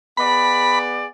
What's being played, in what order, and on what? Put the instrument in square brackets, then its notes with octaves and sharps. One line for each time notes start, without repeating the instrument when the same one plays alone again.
[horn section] B3 G#4 D5 [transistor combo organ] B5